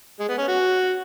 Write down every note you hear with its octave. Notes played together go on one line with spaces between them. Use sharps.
G#3
B3
C#4
F#4